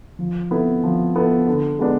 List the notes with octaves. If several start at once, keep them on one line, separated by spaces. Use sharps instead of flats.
F3
B3 E4 A4
F3
B3 E4 A4
D3
G#3 B3 D4